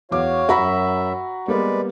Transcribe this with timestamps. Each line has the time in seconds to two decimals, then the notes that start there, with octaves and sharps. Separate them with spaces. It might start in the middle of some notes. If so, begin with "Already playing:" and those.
0.12 E2 F#4 C#5 F5 D6
0.49 F#2 F#4 E5 A#5 B5
1.48 G3 G#3 A#3 B3 B4 D5